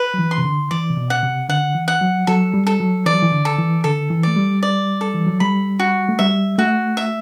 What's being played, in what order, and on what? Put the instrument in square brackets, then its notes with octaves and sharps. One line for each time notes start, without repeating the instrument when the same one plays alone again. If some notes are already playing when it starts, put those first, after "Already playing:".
Already playing: [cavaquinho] B4
[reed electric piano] F#3
E3
[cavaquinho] C6
[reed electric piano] C3
D3
[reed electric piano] E3 [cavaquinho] D5
[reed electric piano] C3
B2
[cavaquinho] F#5
[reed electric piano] C3
[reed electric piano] D3 [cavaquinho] F#5
[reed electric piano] E3
[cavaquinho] F#5
[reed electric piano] F#3
[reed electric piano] F#3 [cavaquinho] A4
[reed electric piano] G3
[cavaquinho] A4
[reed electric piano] F#3
[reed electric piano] E3 [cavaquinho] D5
[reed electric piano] F#3
E3
D3
[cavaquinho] A4
[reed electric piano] E3
[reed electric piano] D3 [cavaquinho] A4
[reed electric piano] E3
[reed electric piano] A3 [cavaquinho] D5
[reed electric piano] G3
[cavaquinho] D5
A4
[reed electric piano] E3
F#3
[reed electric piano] G3 [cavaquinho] B5
[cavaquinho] F#4
[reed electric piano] A3
[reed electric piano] G3 [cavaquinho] E5
[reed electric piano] A3 [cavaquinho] F#4
[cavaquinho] E5